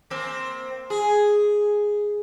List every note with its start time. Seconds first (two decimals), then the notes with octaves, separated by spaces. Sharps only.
0.10 A#3 C4
0.90 G#4